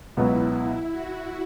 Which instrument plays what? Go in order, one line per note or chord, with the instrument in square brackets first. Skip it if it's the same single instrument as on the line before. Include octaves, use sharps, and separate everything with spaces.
[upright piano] C#2 B2 F#3 B3 F#4 [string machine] E4
[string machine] F#4